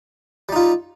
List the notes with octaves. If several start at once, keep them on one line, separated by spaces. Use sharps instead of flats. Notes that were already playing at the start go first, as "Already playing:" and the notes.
G3 D#4 F4